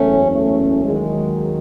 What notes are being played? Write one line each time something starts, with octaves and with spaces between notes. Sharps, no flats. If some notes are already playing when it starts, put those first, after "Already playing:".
Already playing: F#1 E2 C#3 A3 C#4
A3 C#4
D#2 D#3 F#3 G#3